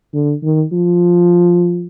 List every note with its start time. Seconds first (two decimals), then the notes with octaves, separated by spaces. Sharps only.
0.14 D3
0.43 D#3
0.72 F3